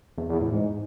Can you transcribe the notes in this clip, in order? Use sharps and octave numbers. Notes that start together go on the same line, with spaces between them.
E2
E2
A2
G#2